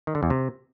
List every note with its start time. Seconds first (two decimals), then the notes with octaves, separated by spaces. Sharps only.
0.07 D#3
0.15 D3
0.23 E2
0.30 C3